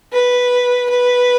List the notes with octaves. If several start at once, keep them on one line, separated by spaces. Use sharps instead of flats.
B4
B4